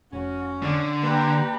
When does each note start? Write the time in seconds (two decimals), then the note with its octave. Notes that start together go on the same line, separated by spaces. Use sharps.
0.13 F1 C#4 F#4
0.63 D3 D5
1.03 G3 A#3 G4 B4 A#5